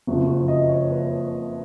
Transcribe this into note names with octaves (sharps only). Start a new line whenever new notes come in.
F#1 F2 C#3 F3 F#4
F#4
D#5
C#5
B4